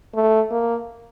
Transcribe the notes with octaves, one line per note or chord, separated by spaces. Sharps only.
A3
A#3